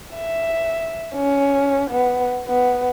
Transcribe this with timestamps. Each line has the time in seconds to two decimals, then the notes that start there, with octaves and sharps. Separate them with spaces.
0.15 E5
1.15 C#4
1.91 B3
2.48 B3